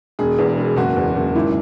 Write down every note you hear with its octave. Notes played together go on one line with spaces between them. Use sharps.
E1 G#4
E2
E1
F#1 F#4
E2
F#1
G#1 E4